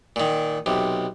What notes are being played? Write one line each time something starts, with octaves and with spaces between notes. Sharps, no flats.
A#2 D#3
B1 C3